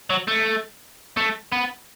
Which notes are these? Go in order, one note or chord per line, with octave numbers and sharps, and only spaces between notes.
F#3
A3
A3
B3